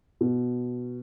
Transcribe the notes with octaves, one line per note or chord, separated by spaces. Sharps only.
B2